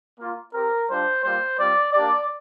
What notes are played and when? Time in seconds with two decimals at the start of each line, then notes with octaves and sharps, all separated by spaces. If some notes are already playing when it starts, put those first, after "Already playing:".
0.20 A#3 F4
0.54 C4 G4 A#4
0.89 G3 D4 F4 C5
1.24 G3 A#3 F4 C5
1.59 G3 C4 F4 D5
1.93 A#3 D4 G4 D5